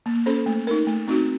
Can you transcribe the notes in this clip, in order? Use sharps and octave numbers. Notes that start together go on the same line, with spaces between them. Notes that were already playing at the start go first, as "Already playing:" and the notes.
A#3
C#4 A4 C5
A3
D#4 A#4
A3
C4 D#4 F#4